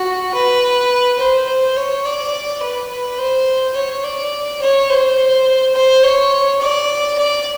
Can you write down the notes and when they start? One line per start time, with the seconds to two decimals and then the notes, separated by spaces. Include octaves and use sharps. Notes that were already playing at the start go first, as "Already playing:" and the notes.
Already playing: F#4
0.34 B4
1.19 C5
1.48 C5
1.76 C#5
2.05 D5
2.62 B4
2.90 B4
3.18 C5
3.75 C#5
4.04 D5
4.61 C#5
4.90 C5
5.75 C5
6.03 C#5
6.61 D5
7.18 D5